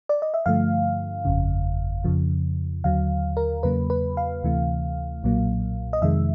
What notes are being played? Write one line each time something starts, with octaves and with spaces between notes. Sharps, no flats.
D5
D#5
E5
G2 D3 F3 A3 F5
G1 F2 C#3
F2 C#3 F3
D#2 D3 F#3 F5
A#4
E2 C#3 F#3 A#3 B4
B4
F5
D2 C3 E3 A3
B1 A#2 F#3 A#3
D#5
F2 C3 D#3 G#3 E5